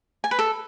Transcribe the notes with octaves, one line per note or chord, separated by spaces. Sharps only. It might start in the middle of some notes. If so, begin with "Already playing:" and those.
G#5
B4
A4